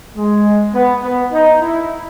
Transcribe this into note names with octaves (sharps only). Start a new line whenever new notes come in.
G#3
B3
B3
D#4
E4